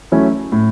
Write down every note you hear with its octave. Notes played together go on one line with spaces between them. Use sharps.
F#3 A3 C#4 E4
A2